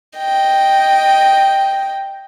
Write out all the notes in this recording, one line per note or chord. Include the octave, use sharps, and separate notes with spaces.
D#5 G5